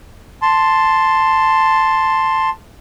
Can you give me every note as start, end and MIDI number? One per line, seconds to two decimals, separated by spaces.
0.42 2.49 81
0.42 2.49 84